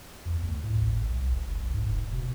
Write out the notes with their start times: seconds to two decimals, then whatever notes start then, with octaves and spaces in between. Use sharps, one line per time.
0.25 E2
0.43 D2
0.64 A2
0.81 G#1
1.10 C2
1.31 F#1
1.58 C2
1.74 G#2
1.87 F1
2.12 B2